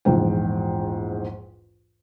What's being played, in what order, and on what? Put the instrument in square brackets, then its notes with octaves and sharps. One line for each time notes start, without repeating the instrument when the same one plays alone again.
[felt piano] A#1 E2 G#2 G5